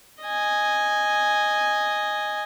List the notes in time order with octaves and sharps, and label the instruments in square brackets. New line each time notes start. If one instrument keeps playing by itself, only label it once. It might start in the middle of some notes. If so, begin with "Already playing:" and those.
[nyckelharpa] D#5 G#5